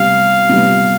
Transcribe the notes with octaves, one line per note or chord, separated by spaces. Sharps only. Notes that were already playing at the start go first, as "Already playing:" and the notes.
Already playing: C3 G3 B3 F5
C3 G3 B3